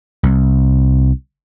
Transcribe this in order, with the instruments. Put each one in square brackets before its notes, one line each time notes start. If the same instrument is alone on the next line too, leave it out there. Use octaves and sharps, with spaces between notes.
[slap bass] C2